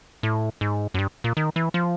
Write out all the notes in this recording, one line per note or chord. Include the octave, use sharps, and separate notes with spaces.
A2
G#2
F#2
G2
A#2
D#3
E3
F3